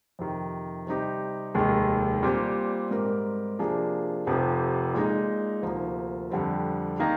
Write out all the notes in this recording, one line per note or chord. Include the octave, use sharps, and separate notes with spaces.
F2 C3 D#3
C3 G3 C4 D#4 G4
F1 D#2 D#3 G#3
A#2 G3 C4 G4
G#2 G3 C4 G4 A#4
C3 F3 A#3 D4 G#4
F1 F2 C3 F3
A#2 G#3 D#4
D2 C3 F3 A#3
F2 D3 G3 C4
D#3 A#3 D#4